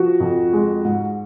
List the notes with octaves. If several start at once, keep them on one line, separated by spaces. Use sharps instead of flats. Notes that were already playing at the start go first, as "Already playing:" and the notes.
Already playing: F3 F#4
F2
G#3
G#2